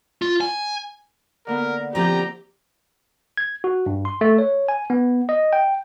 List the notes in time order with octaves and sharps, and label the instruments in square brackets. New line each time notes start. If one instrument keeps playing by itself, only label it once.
[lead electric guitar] F4
G#5
[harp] D3 A#3 B3 [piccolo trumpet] A#4
[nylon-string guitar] F3 C4 E4 [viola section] G4 [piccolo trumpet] A#5
[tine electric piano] G#6
F#4
G2
C6
A3
C#5
G#5
B3
D#5
G5